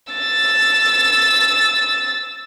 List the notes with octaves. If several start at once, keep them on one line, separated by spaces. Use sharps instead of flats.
E6 A6